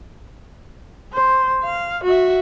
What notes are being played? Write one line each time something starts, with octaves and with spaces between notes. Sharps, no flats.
C5
F5
F#4 E5